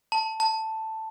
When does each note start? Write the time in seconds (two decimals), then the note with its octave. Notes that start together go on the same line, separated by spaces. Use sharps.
0.12 A5
0.40 A5